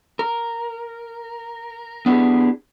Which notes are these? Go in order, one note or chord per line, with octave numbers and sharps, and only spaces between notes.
A#4
B3 D4 E4 G4 G#4